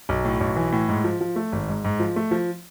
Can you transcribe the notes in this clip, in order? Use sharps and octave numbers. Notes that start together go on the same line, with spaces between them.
B1
A2
B1
E3
A2
G#2
F3
F3
A3
G#1
G#2
G#2
F3
A3
F3